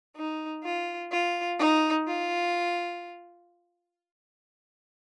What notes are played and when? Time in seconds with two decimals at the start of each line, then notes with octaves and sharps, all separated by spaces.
0.16 D#4
0.64 F4
1.12 F4
1.60 D#4
2.08 F4